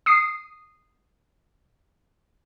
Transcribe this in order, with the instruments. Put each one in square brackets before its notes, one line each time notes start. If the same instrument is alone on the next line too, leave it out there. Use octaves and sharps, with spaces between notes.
[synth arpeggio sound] D#6 C7